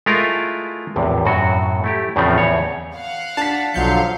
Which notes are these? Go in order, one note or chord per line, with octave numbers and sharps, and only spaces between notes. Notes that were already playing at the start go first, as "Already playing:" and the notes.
G#3 A3 E4 F4 A#4
A#1 E2 A2 C3
F#2 A2 F#3 F#4
A3 E4 G4
E2 A2 C#3 F3 A3 C4
E2 C#5
F5 F#5
D4 A5 B6
B1 D3 F3 F#3 F5 G6 C#7